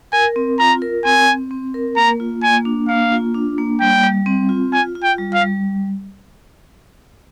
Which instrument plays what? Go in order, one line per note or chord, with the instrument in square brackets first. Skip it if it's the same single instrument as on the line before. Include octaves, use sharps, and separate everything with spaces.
[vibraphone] A#4 [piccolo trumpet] G#5
[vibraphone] C4
[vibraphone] F4 [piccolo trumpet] A#5
[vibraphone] A#4
[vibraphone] C4 [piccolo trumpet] G#5
[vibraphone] C4
C4
A#4
[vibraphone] A#3 [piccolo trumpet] A#5
[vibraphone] F4
[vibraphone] A#3 [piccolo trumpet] G#5
[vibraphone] D4
[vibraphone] A#3 [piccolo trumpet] F5
[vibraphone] F4
D4
A#3
[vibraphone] G3 [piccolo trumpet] G5
[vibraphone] G3
C4
F4
[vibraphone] F4 [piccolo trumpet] G#5
[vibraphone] F4
[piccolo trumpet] G5
[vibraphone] G3
[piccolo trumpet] F5
[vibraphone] G3